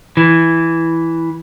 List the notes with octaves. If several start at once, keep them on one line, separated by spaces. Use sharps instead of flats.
E3